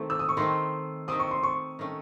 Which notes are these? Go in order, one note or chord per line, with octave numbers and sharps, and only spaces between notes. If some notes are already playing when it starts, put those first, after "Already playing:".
Already playing: D#3 A3 C4
E6
D#6
C#6
D#3 A3 C4 C6
D#3 A3 C4 D#6
C#6
C6
C#6
D#3 A3 C#4